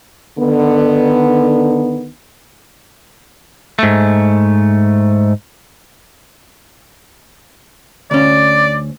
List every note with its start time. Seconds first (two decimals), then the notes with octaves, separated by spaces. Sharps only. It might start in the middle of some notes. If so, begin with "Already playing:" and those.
0.38 D3 D#3 B3
3.79 G#2 A3
8.11 D2 C#4 D5